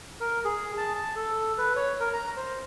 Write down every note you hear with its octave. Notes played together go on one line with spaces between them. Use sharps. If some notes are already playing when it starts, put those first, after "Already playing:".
A#4
G#4
A5
A5
A4
B4
C#5
A#4
A#5
C5